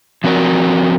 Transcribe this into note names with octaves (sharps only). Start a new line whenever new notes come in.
F3 C4 F#4 A#4